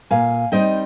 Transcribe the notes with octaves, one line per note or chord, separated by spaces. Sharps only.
A#2 F5 G#5
G3 C4 D#4 D#5 G5